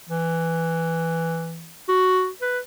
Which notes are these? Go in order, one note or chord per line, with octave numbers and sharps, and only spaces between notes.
E3
F#4
B4